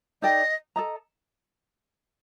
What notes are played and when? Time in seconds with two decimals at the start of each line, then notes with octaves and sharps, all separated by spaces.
0.22 D#4 A4 D5 D#5 G5
0.76 A4 D#5 A#5